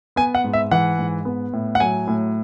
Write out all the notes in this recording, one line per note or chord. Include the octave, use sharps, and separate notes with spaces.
B3 G#5
F#5
G#2
E5
E3 F#5
G#2
B3
A2
F#5
F#3 G#5
A2